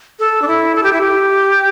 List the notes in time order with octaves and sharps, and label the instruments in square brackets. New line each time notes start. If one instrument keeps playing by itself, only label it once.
[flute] A4
D4
E4
A4
G4
E4
G4